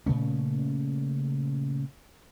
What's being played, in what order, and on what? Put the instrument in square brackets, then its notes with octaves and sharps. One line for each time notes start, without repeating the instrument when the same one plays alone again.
[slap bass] A#2 C#3 A3 C#4